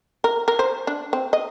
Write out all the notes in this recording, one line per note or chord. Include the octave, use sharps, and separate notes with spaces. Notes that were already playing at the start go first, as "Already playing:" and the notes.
A#4
A#4
C5
D4
C4
D#5